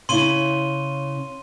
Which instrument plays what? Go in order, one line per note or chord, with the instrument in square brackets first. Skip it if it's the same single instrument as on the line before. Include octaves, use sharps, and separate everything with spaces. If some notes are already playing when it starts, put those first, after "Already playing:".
[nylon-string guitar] C#3 E4 [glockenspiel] C6 D#7 G7